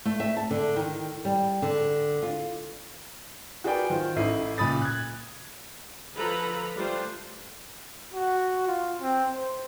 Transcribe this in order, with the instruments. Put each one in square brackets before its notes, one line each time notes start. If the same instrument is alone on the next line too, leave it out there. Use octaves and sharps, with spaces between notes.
[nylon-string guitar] A3
E5
A5
D3
D#3
G3
D3
F4
[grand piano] F#4 G#4 A#4 B4 D5 G5
D#3 F4 C5
A1 A3 D#4 E4 C7 D#7
C#2 A#2 B5 D#6 A6
F#6 G#6
[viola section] D3 F3 A4 B4 A#5 B5
G3 A3 D4 F4 C5
[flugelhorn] F#4
F4
C4
C5